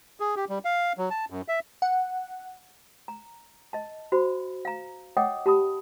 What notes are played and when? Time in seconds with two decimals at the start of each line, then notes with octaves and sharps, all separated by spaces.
0.20 G#4
0.36 G4
0.49 G3
0.65 F5
0.98 F#3
1.10 A5
1.30 F#2
1.48 E5
1.82 F#5
3.08 A#5
3.73 D#5 A5
4.12 F#4 C5 B5
4.65 F5 A#5
5.17 C#5 D#5 F#5 G5 D6 D#6
5.46 G4 A5 B5 D#6